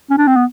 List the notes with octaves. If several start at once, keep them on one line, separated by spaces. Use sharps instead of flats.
C#4
D4
C4
B3